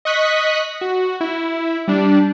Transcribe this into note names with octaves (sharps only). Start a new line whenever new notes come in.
D#5 C#6 D#6 F#6 B6
F#4
E4
G3 D4